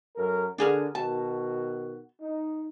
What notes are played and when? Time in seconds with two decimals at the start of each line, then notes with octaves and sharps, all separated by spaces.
0.16 F#2 A4 A#4
0.58 D3 D4 G#4 A#4
0.95 B2 D#3 F#4 A5
2.21 D#4